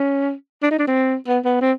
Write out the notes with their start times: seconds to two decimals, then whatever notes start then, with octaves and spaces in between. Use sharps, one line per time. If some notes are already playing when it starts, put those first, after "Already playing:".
Already playing: C#4
0.63 D4
0.71 D#4
0.79 D4
0.87 C4
1.28 B3
1.45 B3
1.61 C4